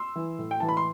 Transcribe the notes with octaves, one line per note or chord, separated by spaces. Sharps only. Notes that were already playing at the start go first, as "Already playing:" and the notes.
Already playing: C6 E6
E3
A2
G5
E3 A5
B5
C6